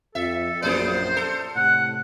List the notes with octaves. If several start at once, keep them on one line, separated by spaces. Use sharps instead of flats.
F2 A4 E5
A#1 F#2 A#3 G#4 C5 D5
A4
A2 C3 F#5 F#6